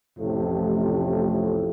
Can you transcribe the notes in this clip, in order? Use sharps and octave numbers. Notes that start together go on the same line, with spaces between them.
A1 F2 A2 C3 F3 A3